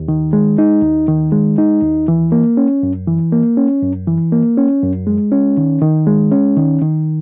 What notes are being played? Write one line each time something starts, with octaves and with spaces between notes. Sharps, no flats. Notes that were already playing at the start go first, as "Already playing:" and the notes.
Already playing: D#2
D#3
G#3
D#4
D#2
D#3
G#3
D#4
D#2
E3
A#3
C#4
F#2
E3
A#3
C#4
F#2
E3
A#3
C#4
F#2
G#3
C#4
D#3
D#3
G#3
C#4
D#3
D#3